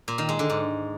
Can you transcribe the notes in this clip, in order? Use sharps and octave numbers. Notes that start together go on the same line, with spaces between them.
A#2
D#3
G#3
D3
G#2